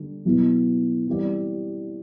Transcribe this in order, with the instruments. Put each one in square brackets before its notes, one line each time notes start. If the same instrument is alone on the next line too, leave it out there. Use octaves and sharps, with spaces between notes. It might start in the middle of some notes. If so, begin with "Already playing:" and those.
Already playing: [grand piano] D3 G3 D4
B2 F#3 B3 E4
E3 G3 C4 G4 D5